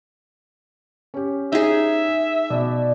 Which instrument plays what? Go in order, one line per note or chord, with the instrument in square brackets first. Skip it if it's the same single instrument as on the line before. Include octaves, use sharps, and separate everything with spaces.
[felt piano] C#4 G4
[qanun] D#4 G#4 [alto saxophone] E5
[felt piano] B2 [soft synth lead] D5